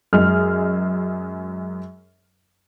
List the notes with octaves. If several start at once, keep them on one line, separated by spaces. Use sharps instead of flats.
F#2 G#3 G#4 F6